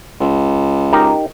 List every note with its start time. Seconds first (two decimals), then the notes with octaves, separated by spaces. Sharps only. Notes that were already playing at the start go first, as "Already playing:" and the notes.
0.20 C#2
0.93 D#4 G4 A#4